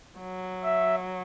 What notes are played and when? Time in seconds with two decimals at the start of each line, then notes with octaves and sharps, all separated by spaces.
0.19 F#3
0.64 E5